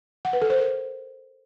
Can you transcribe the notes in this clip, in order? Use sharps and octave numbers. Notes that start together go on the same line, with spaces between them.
F#5
B4
A4
C5
A#4